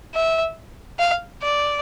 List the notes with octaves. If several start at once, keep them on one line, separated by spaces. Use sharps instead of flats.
E5
F5
D5